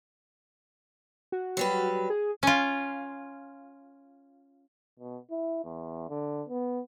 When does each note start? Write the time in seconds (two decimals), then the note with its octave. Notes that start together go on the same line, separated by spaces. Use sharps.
1.32 F#4
1.57 F#3 G3 B4
2.10 G#4
2.43 C#4 F4
4.99 B2
5.31 E4
5.64 E2
6.09 D3
6.49 B3